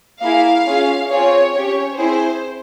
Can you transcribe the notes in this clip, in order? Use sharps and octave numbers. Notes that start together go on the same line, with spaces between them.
A#3 E4 G#4 F5
C#4 F4 G#4
C4 F4 G#4 C#5
C#4 G4 C#5
C4 E4 G#4 C5